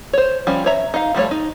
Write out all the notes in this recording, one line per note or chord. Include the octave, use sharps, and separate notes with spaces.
C5 C#5
F3 G3 C#4
C#5 E5 A#5
D#4 F5
F3 G3 A3 C#5
D#4